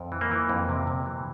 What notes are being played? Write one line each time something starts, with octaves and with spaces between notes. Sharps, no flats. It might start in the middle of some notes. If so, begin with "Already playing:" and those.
Already playing: F2
E3
A#3
E3
F2
C3
C3
E3